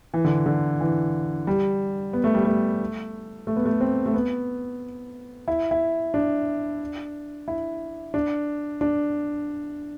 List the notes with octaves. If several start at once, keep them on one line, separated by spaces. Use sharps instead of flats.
E3
D3
D3
E3
G3
B3
A3
G3
A3
A3
B3
A3
C4
A3
B3
E4
E4
D4
E4
D4
D4